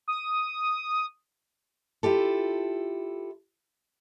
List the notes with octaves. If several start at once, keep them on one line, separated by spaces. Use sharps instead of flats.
D#6
E4 F4 G4 A4